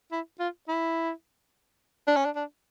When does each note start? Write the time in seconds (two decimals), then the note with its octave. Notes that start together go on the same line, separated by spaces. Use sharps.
0.12 E4
0.39 F4
0.68 E4
2.07 D4
2.16 C#4
2.25 D4
2.35 D4